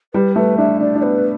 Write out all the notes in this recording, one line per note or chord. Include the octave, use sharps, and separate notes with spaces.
G3 B4
A3 B4
D4 E5
D4 D5
D4
B3 B4